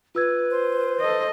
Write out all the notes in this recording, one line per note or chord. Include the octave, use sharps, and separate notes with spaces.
F4 B4 E6 G#6
C5
A4 D#5